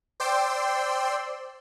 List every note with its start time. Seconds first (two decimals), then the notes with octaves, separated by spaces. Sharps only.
0.20 C5 D5 G5 C6 E6